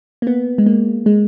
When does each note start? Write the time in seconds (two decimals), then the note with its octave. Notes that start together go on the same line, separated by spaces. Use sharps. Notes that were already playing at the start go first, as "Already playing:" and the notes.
0.22 A#3
0.27 B3
0.58 G#3
0.66 A#3
1.06 G#3